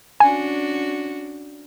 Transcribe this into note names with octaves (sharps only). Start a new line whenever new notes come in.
C#4 D4 F#4 G#5